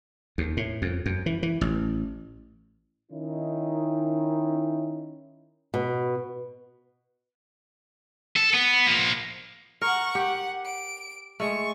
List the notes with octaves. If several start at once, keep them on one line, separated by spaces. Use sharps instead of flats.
D#2
A2
F2
F#2
E3
E3
A1
D#3 C#4 D#4 E4
B2
A4
B3
F3 A#3
A#4 F#5 C#6
G4 F#5
D7
G#3 A3 C#6